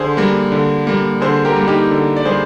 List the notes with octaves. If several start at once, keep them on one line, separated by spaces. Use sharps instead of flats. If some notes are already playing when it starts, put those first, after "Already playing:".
Already playing: D3 G#4 C5
G3 A#3
D3
G3 A#3
D3 G#4 C5
G4 A#4
G3 A#3
D#4 G4
D3
D5
G3 A#3 G#4 C5